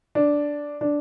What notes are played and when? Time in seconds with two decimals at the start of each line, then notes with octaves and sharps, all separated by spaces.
0.15 D4
0.81 D4